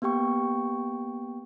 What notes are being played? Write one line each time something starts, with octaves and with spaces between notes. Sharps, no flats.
A#3 B3 G4 G5 C#6